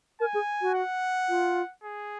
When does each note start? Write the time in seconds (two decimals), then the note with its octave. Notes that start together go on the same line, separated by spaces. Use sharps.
0.20 A#4 G#5
0.34 G#4
0.62 F#4
0.74 F#5
1.29 F4
1.84 G#4